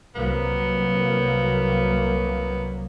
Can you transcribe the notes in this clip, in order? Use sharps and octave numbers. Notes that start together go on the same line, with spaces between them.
C2 F#3 A#3 B3